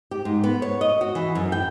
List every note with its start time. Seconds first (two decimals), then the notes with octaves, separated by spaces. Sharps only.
0.11 G4
0.25 G#2
0.44 B3
0.62 C#5
0.81 D#5
1.01 F#4
1.15 E3
1.35 F#2
1.52 G5